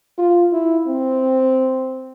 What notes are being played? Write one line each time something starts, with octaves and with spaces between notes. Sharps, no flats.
F4
E4
C4